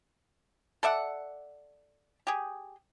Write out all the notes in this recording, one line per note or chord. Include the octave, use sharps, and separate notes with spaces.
A4 D5 E5 F#5
G4 G#4